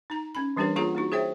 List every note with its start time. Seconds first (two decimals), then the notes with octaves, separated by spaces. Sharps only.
0.10 D#4 A#5
0.35 C#4 B5
0.56 E3 G3 D4 G4 A#4 C#5
0.76 A#3 F4 G#4 C#5 F#5 A#5
0.95 A#3 D#4 F#4
1.12 G#4 C5 C#5 E5 G5